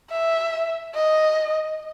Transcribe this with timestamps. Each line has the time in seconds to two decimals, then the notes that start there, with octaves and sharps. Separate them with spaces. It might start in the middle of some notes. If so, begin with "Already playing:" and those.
0.11 E5
0.95 D#5